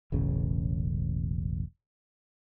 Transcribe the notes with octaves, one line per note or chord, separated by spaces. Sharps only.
E1 A1 C#3